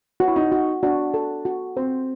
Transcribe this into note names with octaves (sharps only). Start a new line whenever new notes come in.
F#4
E4
D#4
F#4
D4 F#4
A4
F#4
C4 C5